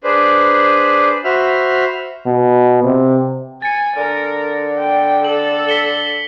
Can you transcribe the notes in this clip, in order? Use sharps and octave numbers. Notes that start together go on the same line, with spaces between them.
D4 G#4 B4 C5 D5
F#4 C5 E5 B5 F6
B2
C3
G#5 A6 C#7
D3 A#4
G5
A4 F#7
B6 C#7 G7